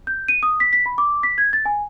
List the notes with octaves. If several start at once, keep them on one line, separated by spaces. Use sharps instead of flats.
G6
D#7
D#6
B6
B6
B5
D6
B6
G#6
A6
G#5